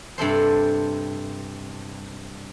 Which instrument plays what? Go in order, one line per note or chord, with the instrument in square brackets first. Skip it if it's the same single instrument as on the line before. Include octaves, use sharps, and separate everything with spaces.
[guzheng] G2 C3 A4 C5